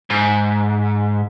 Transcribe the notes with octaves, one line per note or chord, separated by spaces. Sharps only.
G#2